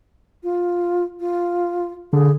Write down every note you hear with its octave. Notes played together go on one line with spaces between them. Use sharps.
F4
F4
D3 G#4